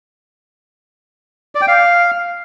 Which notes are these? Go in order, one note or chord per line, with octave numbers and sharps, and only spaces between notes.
D5
G5
F5